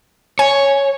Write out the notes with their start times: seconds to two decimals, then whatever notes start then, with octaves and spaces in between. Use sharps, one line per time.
0.39 C#5 G#5